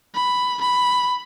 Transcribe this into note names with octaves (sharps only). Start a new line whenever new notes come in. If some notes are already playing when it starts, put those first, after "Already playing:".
B5
B5